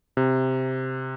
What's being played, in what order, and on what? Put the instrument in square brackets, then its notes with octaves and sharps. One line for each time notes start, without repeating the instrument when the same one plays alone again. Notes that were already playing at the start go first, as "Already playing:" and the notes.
[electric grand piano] C3